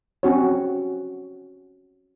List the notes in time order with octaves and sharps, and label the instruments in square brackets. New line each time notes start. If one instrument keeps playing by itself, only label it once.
[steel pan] C4 C#4 F#4 C#5